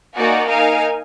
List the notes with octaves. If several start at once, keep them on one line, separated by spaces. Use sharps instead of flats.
A#3 D#4 F#4 D5 G#5
D#4 A#4 F5 G#5